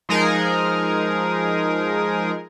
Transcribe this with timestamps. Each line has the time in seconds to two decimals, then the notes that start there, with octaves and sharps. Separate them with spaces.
0.09 F3 G#3 D#4 G#4 A#4